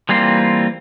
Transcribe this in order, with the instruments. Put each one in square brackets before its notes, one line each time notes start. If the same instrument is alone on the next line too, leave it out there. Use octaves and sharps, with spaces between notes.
[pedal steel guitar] E3 G3 A#3 C4 F4